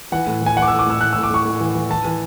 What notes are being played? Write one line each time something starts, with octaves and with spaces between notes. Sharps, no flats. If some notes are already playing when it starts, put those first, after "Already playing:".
E3 F#5
A2
E3
G#5
E3 F#5
D6
A2 E6
D6
A2 E6
A2 F#6
A2 E6
D6
A2 C#6
A2
E3
E3
E3 A5
E3